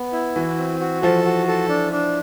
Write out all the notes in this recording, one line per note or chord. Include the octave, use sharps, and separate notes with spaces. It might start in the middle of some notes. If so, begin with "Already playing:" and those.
Already playing: B3
E4
E3 F#4
C4
F#4
F3 A4
F#4
A4
D4
D4